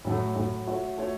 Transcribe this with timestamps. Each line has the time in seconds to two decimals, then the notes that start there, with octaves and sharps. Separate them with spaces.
0.05 A2 F#3 A3
0.36 A2 F#3 A3
0.67 A3 F#4 C#5 E5
0.98 A3 F#4 C#5 E5